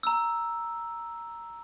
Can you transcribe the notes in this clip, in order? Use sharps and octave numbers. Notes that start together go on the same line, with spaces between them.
A#5 E6